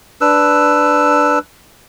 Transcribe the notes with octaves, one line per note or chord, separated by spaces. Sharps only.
D4 B4 E6